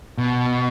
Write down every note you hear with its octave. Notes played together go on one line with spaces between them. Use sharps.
B2